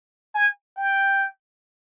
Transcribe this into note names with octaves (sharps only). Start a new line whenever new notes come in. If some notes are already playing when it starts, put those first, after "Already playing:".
G#5
G5